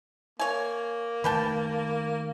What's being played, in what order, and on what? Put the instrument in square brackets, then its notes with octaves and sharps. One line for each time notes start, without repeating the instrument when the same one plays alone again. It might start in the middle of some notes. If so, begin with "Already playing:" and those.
[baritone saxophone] A#3 [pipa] C#5 G#5
[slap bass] D#3 A3 [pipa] B4 G5 A5